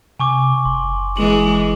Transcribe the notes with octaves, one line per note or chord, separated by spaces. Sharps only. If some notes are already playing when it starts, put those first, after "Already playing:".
C3 G#5 C#6 D6
F#1 C6
E3 G#3 F#7